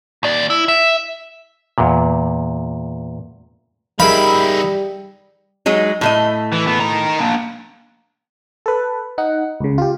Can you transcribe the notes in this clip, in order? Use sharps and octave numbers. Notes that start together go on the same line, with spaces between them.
D#2 D5
E4
E5
E2 A#2
G3 D#4 G#4 A#4 E5 F5 B5
F#3 G#3 D#4
A2 A3 D#5
E3
E3 B3
D#3 A#5
A#3 D4
A4 B4
D#4 F#5
C#2 C#3
F4 G4